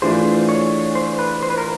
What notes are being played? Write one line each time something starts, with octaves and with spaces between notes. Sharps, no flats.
E3 A3 D4 F4 G#4 C5
C#5
C5
B4
C5
B4
A#4